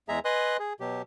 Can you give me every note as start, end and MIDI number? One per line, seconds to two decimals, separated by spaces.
0.08 0.19 40
0.08 0.19 56
0.08 0.19 68
0.08 0.19 76
0.08 0.19 82
0.25 0.57 71
0.25 0.57 75
0.25 0.57 80
0.25 0.57 84
0.25 0.57 87
0.25 0.57 90
0.59 0.73 68
0.80 1.02 47
0.80 1.02 54
0.80 1.02 67